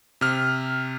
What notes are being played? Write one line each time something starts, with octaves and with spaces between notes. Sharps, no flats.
C3 F6